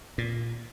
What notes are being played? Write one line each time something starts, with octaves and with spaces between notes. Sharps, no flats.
A#2